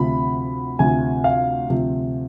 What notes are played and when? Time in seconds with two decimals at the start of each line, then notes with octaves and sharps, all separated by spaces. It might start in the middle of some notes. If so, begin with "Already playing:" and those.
Already playing: D2 C3 F3 B5
0.79 D2 C3 F3 G#5
1.24 F5
1.69 D2 C3 F3